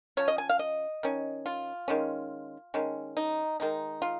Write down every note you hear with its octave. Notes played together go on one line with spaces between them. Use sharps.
F3 C#4 C#5
D#5
G#5
F5
D#5
D#3 C#4
F4
D#3 G#3 C#4
D#3 G#3 C#4
D#4
D#3 G#3 D#4
F4